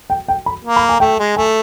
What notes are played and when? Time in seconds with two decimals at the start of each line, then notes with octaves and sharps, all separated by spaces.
0.10 G5
0.28 G5
0.46 B5
0.65 A#3
0.76 B5
0.89 G#5
1.00 A3 G5
1.19 G#3
1.36 A3 G#5